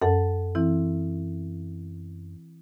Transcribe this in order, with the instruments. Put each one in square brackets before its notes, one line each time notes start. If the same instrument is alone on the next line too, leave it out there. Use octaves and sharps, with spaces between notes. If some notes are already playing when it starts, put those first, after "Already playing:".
[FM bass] F#2 [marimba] A4 F#5 A5
[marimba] E3 C4 E4